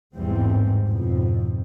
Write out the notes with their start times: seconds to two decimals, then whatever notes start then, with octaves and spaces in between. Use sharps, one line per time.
0.15 A1 E2 G#2 G3 G#3 C4
0.87 F2 G#2 B2 F3